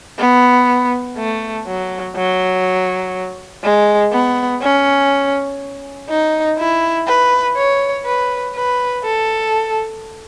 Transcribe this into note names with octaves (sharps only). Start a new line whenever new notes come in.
B3
A3
F#3
F#3
G#3
B3
C#4
D#4
E4
B4
C#5
B4
B4
A4